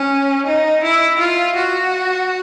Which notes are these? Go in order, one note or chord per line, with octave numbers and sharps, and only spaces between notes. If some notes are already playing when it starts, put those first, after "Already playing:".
Already playing: C#4
D#4
E4
F4
F#4